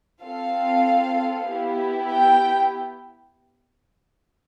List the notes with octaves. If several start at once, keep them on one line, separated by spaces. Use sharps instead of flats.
C4 F4 A4 F5
B3 E4 G4
G5